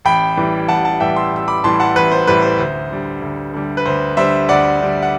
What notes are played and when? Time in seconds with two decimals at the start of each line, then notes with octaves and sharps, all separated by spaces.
0.05 A1 G5 B5
0.37 A2 E3 G3
0.68 A1 F#5 A5
0.84 F#5 A5
1.00 A2 E3 G3 E5 G5
1.16 C6 E6
1.32 A1 E6
1.48 B5 D6
1.64 A2 E3 G3 A5 C6
1.80 F#5 A5
1.95 A1 B4
2.12 C5
2.27 A2 E3 G3 B4
2.42 C5
2.59 D2 C5
2.90 D3 G3
3.22 D2
3.54 D3 G3
3.77 B4
3.86 D2 C5
4.17 D3 G3 C5 E5
4.49 D2 D5 F#5
4.80 D3 G3
5.02 F#5